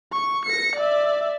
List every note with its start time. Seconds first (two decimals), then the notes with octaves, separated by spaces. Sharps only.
0.13 C#6
0.46 A#6 C#7
0.76 D5 E5